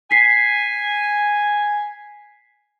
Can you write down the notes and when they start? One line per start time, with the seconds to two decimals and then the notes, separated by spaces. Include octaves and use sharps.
0.11 G#5 B6 C7